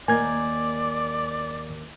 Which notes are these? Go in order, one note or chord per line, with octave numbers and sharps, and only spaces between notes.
D#2 A#3 D5 G#5 G#6